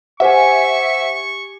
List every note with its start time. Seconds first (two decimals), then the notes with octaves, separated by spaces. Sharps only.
0.20 G4 C5 E5 F#5 G#5 C#6